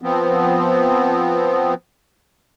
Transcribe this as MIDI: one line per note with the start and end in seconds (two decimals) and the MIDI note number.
0.02 1.74 53
0.02 1.74 59
0.02 1.74 60